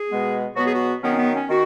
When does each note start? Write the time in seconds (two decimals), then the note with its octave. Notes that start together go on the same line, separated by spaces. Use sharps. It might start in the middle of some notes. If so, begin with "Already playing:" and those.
Already playing: G#4
0.09 B2 G#3 B3
0.56 B2 F#3 B3 F#4
0.65 G#4
0.74 F#4
1.03 D#3 F#3 B3 C#4
1.13 C#4
1.18 B3
1.34 C#4
1.50 D#3 F#4